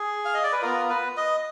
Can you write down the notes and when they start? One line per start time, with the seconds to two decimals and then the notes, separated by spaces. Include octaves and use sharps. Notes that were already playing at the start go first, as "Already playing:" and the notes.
Already playing: G#4
0.25 F5
0.34 D#5
0.44 D5
0.52 B4
0.62 B3 F4 A#4
0.89 B4
1.17 D#5